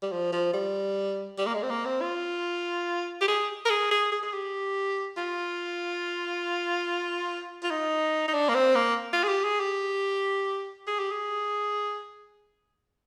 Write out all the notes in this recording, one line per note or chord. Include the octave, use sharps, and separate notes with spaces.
G3
F3
F3
G3
G3
A#3
G#3
C4
A#3
C4
F4
G4
G#4
A#4
G#4
G#4
G#4
G#4
G4
F4
F4
D#4
D#4
D4
A#3
C4
A#3
F4
G#4
G4
G#4
G4
G#4
G4
G#4